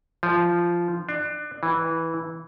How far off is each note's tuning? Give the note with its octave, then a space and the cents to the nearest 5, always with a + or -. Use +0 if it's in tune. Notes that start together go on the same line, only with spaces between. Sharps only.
F3 -10
D4 +25
E3 -10